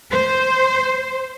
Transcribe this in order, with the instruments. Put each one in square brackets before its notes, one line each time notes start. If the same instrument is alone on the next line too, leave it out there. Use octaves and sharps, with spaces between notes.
[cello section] C5